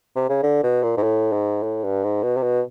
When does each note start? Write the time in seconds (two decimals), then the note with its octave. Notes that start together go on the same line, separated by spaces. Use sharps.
0.16 C3
0.29 C#3
0.43 D3
0.64 B2
0.83 A#2
0.97 G#2
1.03 A2
1.33 G#2
1.63 A2
1.84 G2
2.04 G#2
2.23 B2
2.37 C3
2.43 B2